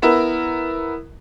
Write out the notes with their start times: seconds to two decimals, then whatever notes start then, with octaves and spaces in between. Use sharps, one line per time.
0.02 B3 E4 A#4